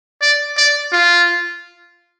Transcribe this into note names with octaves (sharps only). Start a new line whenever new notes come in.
D5
D5
F4